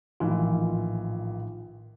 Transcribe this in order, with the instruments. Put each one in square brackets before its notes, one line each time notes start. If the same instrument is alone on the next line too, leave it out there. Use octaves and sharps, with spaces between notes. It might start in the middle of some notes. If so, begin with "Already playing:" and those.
[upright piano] A#1 D#3 E3 [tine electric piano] A2 F4